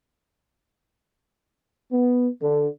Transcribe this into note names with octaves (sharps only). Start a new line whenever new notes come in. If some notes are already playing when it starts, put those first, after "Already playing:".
B3
D3